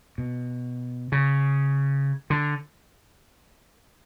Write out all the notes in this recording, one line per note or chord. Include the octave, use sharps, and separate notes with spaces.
B2
C#3
D3